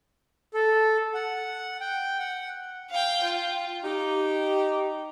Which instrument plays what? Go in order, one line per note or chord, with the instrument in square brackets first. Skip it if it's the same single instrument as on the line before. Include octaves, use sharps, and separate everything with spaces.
[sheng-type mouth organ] A4
F#5
G5
F#5
[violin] F5 G5
F4
[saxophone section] D#4 G4